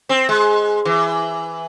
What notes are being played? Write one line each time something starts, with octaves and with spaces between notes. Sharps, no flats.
C4
G#3
E3